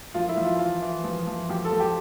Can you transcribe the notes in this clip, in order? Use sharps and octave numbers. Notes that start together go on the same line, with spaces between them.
F3 F4
E4
F3
F4
E3 F4
E3
F3
F3
F3 G4
A4
F3
G4